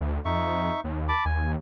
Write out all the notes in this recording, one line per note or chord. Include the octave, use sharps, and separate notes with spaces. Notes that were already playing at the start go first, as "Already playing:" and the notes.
D2
F2 D#4 E5 C#6
D#2
A5 B5 D6
D#2 G#5